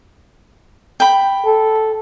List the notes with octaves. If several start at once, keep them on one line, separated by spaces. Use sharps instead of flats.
G5 B5
A4